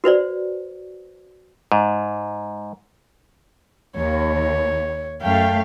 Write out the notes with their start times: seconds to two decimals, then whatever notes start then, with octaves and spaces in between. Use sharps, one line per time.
0.04 F#4 B4 C5 D5
1.72 G#2
3.96 D#2 C#5
5.22 F#2 A3 F5 G5